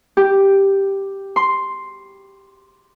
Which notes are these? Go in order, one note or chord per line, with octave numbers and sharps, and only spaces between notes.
G4
C6